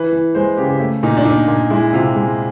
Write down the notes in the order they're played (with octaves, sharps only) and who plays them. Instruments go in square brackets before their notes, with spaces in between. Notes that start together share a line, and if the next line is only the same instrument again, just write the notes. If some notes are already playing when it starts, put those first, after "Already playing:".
Already playing: [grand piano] E3 B4
E3
G#3 C5
C#3 G4
G4
A3
A#2 D#4
D4
A#2 D#4
A#2
G#3 E4
C3 F4
G#3